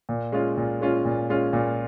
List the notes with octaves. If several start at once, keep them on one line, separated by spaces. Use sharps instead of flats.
A#2
G#3 C#4 F4
A#2
G#3 C#4 F4
A#2
G#3 C#4 F4
A#2